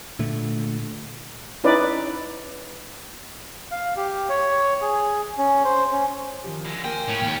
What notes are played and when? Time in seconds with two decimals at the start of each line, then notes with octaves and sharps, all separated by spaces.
0.19 A#2 D3 A3
1.64 C#4 D#4 E4 B4 D5
3.71 F5
3.97 G4
4.30 C#5
4.82 G#4
5.38 C#4
5.65 C5
5.92 C#4
6.44 D#3 F3 G4
6.65 D3 G#3
6.84 A#3 A#4 C5 G5 G#5
7.08 A2 C#4
7.23 D#2